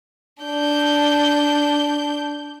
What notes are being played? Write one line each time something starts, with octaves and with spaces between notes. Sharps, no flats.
D4 G6